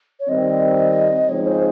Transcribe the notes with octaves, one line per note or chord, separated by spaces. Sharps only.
C#5
D#3 G3 C4 D#5
C#3 F3 G#3 C4 D#4 C#5
C5